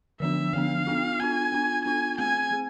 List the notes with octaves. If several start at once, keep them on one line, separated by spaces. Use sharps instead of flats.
D3 F3 B3 D4 E5
D3 F3 B3 D4 F5
B3 D4 F4
B3 D4 F4 G#5
B3 D4 F4
B3 D4 F4 G#5
A3 C4 G#4 G#5
A3 C4 G#4